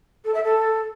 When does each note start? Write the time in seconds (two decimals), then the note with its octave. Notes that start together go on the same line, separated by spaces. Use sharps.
0.25 A4
0.34 E5
0.44 A4